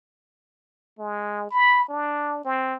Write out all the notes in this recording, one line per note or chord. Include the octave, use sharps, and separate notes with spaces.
G#3
B5
D4
C4